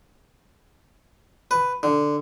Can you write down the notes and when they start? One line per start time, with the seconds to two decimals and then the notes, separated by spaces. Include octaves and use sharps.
1.51 B4
1.83 D3